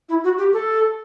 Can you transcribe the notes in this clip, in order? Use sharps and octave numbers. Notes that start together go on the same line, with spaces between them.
E4
F#4
G4
A4